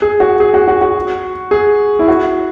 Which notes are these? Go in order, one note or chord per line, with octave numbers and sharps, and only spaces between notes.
G#4
F#4
G#4
F#4
F#4
F#4
G#4
E4
F#4